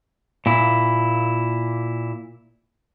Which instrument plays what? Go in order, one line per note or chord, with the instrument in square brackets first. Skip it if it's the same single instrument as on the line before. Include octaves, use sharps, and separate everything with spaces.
[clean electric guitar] A#2 E4